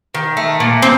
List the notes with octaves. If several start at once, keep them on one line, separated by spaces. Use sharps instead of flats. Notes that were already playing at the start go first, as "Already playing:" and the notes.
D#3
A3
A#2
C4